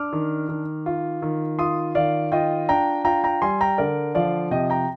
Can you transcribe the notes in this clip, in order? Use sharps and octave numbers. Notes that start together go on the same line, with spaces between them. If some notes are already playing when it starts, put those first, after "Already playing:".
Already playing: D4 D6 F6
D#3
D#3
F4
D#3
F4 C6 D#6
D#3 D5 F5
F4 D#5 G5
D4 G5 A#5
F4 G5 A#5
G5 A#5
G3 G#5 C6
G5 A#5
D3 A#4 D5
F3 D5 F5
C3 D#5 G5
G5 A#5